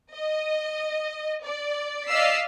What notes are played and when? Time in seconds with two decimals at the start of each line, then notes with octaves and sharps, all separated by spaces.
0.13 D#5
1.42 D5
2.08 D5 D#5 F5 E6 B6 C7